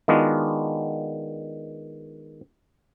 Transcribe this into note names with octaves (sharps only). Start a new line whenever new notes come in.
D#3 G#3 B3 D4 F4 F#4